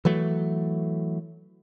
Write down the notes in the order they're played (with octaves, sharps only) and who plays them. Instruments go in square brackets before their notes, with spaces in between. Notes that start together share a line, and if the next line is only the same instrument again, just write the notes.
[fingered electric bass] E3 F#3 A3